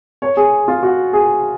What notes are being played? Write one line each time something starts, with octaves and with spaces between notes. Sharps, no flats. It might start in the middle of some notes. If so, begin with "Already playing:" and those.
C#5
G#4
F4
F#4
G#4